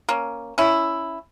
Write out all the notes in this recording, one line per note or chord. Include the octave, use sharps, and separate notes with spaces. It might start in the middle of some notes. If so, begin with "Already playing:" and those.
A#3 C#4
C#4 E4